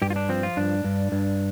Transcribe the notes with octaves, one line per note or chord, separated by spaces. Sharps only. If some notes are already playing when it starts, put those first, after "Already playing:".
G2 G4
F4
D4
F3 C4
F4
G2 D4
G2
G2